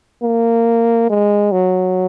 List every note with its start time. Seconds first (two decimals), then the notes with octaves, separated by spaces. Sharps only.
0.23 A#3
1.10 G#3
1.52 F#3